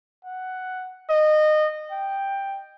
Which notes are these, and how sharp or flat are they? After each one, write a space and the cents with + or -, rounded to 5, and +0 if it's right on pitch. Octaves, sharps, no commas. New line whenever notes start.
F#5 +5
D#5 -20
G5 +5